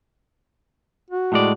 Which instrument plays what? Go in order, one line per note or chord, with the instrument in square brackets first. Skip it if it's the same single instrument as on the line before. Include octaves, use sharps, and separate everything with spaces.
[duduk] F#4
[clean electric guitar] A2 G#3 D5